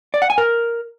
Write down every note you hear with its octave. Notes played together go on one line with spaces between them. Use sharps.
D5
F#5
G#5
A#4